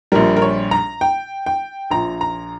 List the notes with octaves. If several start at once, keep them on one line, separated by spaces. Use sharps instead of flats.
A#1 A#2 G3 A#4
A#4
C#5
A#5
G5
G5
A#1 A#2 F3 A#5
A#5